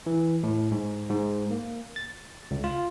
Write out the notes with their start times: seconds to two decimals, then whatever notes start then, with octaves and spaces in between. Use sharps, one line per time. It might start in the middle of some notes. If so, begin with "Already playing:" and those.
0.06 E3
0.43 A2
0.72 G#2
1.11 G#2
1.51 A#3
1.96 A6
2.51 C#2
2.64 F4